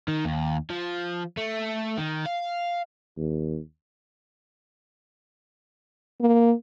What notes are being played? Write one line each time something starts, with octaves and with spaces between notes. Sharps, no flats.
D#3
D#2
F3
A3
D#3
F5
D#2
A#3